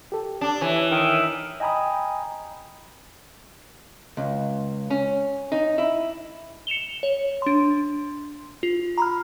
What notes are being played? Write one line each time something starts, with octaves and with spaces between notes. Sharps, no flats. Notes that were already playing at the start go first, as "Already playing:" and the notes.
G4 A4
D4
E3 C#5 G#5
D#3
D#5 G5 G#5 A#5 B5 D#6
C#2
C#4
D#4
E4
C#7 E7 F7 G7
C#5
D4 C6
F4
A#5 B5 F6